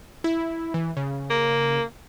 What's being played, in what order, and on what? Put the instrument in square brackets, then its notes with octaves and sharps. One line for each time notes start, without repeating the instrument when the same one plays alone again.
[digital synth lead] E4
E3
C#3
[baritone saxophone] A#3